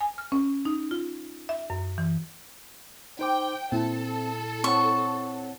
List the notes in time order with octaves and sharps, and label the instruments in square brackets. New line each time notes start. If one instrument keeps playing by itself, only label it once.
[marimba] G#5
F6
C#4
D#4
F4
E5
F#2
E3
[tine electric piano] D#4 C5 D6 [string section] G5
[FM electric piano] A#2 E4 [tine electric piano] C4 [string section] A4
[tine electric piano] C4 C#5 F#5 [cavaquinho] C#6